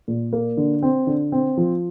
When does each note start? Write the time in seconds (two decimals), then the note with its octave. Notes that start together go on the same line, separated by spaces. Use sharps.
0.08 A#2
0.33 A#3
0.57 D3
0.82 C4
1.07 D3
1.32 C4
1.57 F3